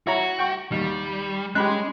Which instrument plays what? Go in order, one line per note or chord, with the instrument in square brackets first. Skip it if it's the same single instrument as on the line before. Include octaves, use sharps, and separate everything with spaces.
[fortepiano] E4 C#5 A#5 [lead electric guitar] F#4
[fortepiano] G5 C#6
[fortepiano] D#2 [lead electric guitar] G3
[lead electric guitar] G#3 [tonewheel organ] C#4 D#5 C6 [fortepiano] G4 B5 F#6